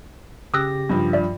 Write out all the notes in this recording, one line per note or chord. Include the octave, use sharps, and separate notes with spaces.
C#3 G4 D#6 E6 F#6 A#6
G2 F3
D5 E5